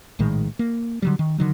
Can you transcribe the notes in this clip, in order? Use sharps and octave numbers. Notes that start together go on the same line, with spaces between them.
A#1 A2 D#3 G#3
A#3
D3 F#3 G3
D#3
D3 D#3 F#3